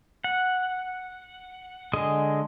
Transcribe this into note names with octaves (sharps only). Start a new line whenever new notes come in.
F#5
D3 G#3 G#4 D#5